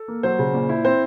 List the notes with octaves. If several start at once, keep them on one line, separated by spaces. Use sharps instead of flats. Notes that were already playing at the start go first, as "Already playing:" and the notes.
Already playing: A4
A#3
F#3 C5
C#3
A#2
E4
C4 C5